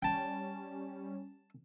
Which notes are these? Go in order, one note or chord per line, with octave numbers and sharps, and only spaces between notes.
G3 C#4 G5 A5